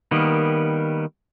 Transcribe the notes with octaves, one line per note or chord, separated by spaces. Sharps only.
D#3 G3 A#3 B3